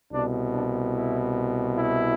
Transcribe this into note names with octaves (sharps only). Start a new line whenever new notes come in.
C2 B2 D4
D4
E4
E4